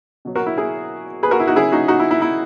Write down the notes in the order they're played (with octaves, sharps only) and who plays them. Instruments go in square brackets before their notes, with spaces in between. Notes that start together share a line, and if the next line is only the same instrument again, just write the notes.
[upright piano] B2 F#3
F#4 A#4
E4
E4 G#4
G#4 B4
F#4 A#4
E4
D#4 F#4
C#3 F#3 E4 G#4
D#4 F#4
D#4 F#4
E4
E4
E4